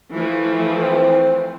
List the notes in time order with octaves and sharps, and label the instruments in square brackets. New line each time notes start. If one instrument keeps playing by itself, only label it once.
[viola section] E3 F3 A3
[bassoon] C4